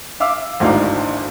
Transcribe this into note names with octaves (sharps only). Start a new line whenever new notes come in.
E5 F5 D6 E6
G#1 D2 E3 D4 D#4 F5